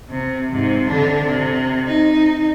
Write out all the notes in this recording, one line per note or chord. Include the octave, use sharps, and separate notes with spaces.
C3
G#2 C3
D3 D4
C3
D#4